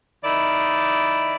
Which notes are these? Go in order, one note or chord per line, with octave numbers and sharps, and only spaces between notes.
D#3 E4 D5 D#5